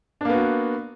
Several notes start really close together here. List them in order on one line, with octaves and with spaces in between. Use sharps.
D4 A#3 B3 F#4